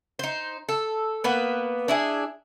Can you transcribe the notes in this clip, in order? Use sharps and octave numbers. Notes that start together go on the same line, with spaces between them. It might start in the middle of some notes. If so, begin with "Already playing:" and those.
D#4 C5
A4
A#3 B3 B4
D4 E4 G#4